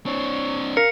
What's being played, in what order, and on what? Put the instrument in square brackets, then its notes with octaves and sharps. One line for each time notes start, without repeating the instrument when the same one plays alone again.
[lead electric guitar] C4 D4 [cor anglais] C#5
[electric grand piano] A#4 [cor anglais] F5 [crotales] C#7